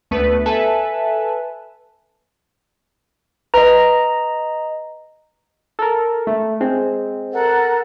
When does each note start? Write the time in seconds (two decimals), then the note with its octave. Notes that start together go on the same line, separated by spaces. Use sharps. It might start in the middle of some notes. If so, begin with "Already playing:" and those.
0.11 D2 A3 B3 B4
0.46 A4 B4 E5 G#5 A5
3.54 B4 D#5 A#5
5.79 A4 A#4
6.27 A3
6.60 G#3 C4
7.32 A4 A#4 F#5